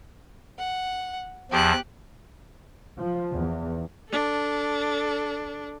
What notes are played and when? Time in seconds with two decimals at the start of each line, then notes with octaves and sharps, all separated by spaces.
0.59 F#5
1.51 E2 F3 G4 F#6
2.99 F3
3.34 E2
4.09 D4 A4